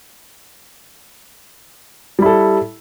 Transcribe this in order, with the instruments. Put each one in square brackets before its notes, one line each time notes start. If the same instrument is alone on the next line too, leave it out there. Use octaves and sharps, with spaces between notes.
[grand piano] G3
E4
A4